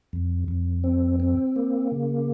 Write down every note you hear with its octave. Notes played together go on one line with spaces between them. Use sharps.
F2
F2
C4
C4
A#3
C#3